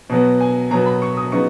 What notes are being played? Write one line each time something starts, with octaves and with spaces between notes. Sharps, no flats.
B2 F#3 B3
G#5
B2 F#3 B3 A#5
B5
C#6
D#6
C#3 F#3 B3 D#4 C#6